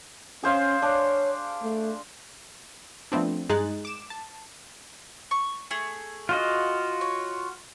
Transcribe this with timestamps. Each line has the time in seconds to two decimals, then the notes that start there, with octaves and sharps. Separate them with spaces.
0.43 C#4 G#4 C5 F5
0.82 D4 C#5
1.63 A3
3.12 F3 A3 B3 C4 D4
3.49 G2 G#3 D#4 G#4 F#6 A6
3.85 D6 E7
4.10 A5
5.31 C#6
5.71 A3 G#4
6.29 F4 F#4 D#5
7.01 C#5